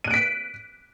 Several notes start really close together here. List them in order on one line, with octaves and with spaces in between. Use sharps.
D#7 F#6 D7 B6